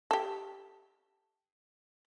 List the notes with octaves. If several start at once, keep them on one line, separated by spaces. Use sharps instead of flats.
G4 A4